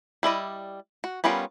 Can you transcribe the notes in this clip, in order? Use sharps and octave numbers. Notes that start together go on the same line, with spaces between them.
G3 E4 D5 D#5
F#4
G3 B3 C#4 F4 A#4